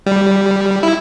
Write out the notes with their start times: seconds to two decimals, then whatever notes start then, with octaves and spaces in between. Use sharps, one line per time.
0.06 G3
0.83 E4